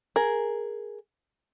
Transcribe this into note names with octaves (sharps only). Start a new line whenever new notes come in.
G#4 A#4